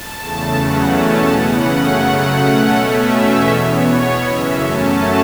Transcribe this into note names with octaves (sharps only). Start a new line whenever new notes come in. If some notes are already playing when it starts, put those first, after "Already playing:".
Already playing: A5
E2 C#3 A3
E2 C#3 F#3 A3 C#4 F#5
E2 B2 A3 C#4 A5
C#3 E3 B3 F#5
F#2 C#3 A3 C#4
C#3 F#3 A3
B2 A3 C#4
B2 A3 C#4 E5
E2 B2 A3 C#4
E2 E3 B3 C#5
B2 B3
F#2 C#3 E3 C#4 E5
F#2 F#3 A3 C#4 A5